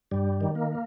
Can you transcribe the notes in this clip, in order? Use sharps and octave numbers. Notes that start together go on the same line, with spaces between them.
G2 G3
D#3
A#3